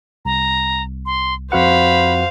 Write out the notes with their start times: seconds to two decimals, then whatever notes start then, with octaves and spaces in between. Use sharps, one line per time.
0.25 C2 A#5
1.06 C6
1.52 F2 F#4 C5 F5 F#5 B5